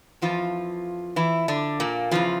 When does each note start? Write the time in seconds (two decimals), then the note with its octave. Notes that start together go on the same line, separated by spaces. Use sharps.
0.22 F2 E3 F3 F4
1.16 E3 E4
1.48 D3 D4
1.80 A#2 A#3
2.11 E2 C#3 E3 F3 F4